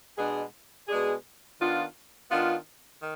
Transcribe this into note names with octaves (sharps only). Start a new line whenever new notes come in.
B2 G#3 D4 G#4
B2 G#3 D4 G#4
D#3 B3 D4 F4
D#3 B3 D4 F4
D#3